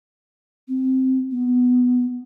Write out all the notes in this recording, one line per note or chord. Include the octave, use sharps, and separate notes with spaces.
C4
B3